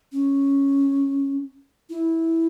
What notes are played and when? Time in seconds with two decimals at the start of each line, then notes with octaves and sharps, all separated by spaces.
0.12 C#4
1.90 E4